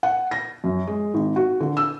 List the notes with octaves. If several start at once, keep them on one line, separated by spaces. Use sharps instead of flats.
F#5
A#6
F#2
G#3
G#1
F#4
D3
E6